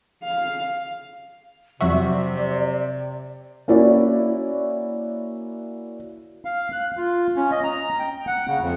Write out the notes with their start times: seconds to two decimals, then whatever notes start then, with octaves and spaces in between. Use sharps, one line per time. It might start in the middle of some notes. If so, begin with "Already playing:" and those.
0.24 F5
1.81 F2 C3 F#3 F#4 D5 E5
3.68 A#3 C#4 E4 F#4 C#5 D5
6.45 F5
6.72 F#6
6.97 F4
7.36 C#4
7.51 D#5
7.64 A#5
7.99 G5
8.27 F#5
8.47 C#3
8.61 F2